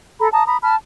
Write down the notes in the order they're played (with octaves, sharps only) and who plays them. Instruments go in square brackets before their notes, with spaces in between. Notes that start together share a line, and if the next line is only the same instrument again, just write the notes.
[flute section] A4 A#5 B5
A5 A#5 D#6
A#5 B5 D#6
A5 B5 F6